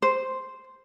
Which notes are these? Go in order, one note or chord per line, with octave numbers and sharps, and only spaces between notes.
C5